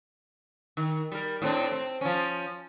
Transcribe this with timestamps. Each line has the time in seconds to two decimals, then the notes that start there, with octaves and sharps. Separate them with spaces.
0.77 D#3
1.12 G3 A#4
1.42 A2 C4 D4
1.72 C4
2.01 F3 C#4